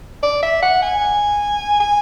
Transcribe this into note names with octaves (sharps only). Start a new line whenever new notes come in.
D5
E5
F#5
G#5
G#5